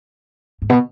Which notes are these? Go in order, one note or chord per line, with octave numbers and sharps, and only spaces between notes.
G#2
B2